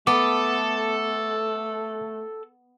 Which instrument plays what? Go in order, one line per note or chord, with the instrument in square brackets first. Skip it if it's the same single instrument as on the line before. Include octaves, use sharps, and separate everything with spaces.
[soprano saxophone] A3 [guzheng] B3 [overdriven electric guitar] A4 [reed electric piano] D6